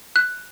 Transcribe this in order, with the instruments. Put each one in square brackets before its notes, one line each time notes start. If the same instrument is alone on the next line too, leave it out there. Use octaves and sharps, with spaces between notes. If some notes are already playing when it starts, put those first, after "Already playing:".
[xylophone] F#6